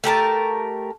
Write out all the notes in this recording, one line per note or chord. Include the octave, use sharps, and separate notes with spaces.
A3 G4 A#4 A5